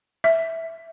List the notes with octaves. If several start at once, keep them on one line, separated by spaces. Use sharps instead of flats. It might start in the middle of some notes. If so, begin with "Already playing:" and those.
E5